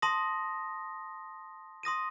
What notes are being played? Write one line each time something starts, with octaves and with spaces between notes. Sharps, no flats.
A5 C6 D#6 A#6
C6 D#6 A#6 D#7